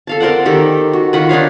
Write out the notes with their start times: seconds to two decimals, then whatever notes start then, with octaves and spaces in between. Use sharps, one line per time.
0.07 A4 F5 A5
0.20 A#4 C5 D5 F#5
0.45 D#3 G4 A4
0.93 F#4
1.13 D#3 F4 F#5 B5
1.29 D4 D#4 C#5 F5